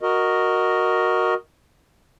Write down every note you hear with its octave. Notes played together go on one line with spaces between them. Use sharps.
F#4 A#4 D#5